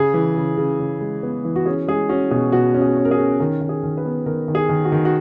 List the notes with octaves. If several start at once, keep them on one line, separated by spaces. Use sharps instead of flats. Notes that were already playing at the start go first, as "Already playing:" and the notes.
Already playing: C#3 G#4
E3
C#3
C#3
C#3
G#3
B3
E3
F#4
C#4 G#4
G#3 G#4
C#4 F#4
B2 G#4
B2 F#4
C#4
G#4
C#4
A#4
G#4
C#4
D#3 A#4
D#3
G#4
D#3
B4
B3
D#3 A#4
D#3
G#4
D#3
F#4
D#3
F#4